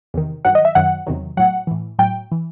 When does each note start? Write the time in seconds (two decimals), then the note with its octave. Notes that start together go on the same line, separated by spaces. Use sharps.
0.14 E2 C3 D#3
0.45 G2 D#3 F#3 F#5
0.55 D#5
0.65 E5
0.75 F#2 D#3 F#3 F#5
1.07 E2 C3 D#3 F#3
1.37 A2 F#3 F#5
1.67 A2 E3
1.99 A2 F#3 G5
2.32 E3